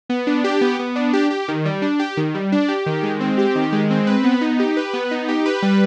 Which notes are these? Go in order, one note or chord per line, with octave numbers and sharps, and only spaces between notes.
B3
D4
G4
B3
B3
D4
G4
G4
D#3
G3
D4
G4
D#3
G3
D4
G4
D#3
G#3
C4
G4
D#3
G#3
C4
B4
B3
D#4
G4
B4
B3
D#4
G4
B4
G3